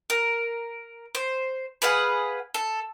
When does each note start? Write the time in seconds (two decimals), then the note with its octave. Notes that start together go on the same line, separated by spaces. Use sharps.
0.10 A#4
1.15 C5
1.82 G#4 B4 F5 F#5
2.54 A4